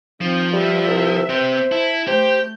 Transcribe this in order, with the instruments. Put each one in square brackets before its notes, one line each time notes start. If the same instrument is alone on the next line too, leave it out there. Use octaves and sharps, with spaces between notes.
[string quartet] D#3 C4 [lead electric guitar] F3
[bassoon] G3 [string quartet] B4 E5
[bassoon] C2
[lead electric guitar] C4 G4 [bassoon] C5
[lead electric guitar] E4 [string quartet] A5
[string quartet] A3 G6 [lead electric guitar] G4 [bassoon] C5